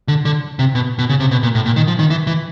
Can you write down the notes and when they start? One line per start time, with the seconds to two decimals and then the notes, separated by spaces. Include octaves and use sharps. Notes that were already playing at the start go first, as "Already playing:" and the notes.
0.08 D3
0.25 D3
0.59 C3
0.75 B2
0.99 B2
1.09 C#3
1.20 C3
1.31 B2
1.43 A#2
1.55 A2
1.66 A#2
1.76 D#3
1.87 F3
1.99 D#3
2.10 E3
2.27 E3